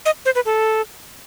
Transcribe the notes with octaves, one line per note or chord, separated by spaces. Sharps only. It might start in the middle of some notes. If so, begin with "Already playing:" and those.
D#5
C5
B4
A4